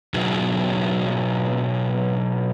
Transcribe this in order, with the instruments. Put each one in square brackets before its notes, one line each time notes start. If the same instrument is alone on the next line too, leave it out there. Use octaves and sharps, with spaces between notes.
[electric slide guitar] B2 F#3 D#4 F#4 G#4